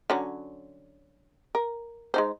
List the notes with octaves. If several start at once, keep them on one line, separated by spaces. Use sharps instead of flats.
D3 F#3 C#4
A#4
G#3 D#4 C5